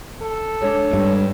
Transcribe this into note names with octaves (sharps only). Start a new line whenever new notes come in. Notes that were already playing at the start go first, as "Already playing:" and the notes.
A4
G#3 D4 C#5
G2